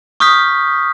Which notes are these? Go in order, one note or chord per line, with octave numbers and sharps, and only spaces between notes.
C#6 D#6 F6 G6 B6